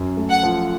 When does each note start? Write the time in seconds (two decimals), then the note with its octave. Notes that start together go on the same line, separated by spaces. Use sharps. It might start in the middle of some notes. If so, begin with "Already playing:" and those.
Already playing: F#2
0.17 A3
0.30 F#5
0.43 F3